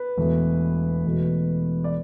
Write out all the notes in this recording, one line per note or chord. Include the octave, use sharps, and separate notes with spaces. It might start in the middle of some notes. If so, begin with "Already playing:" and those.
Already playing: B4
E1 E2 B2 A3
E1 E2 B2 A3
D5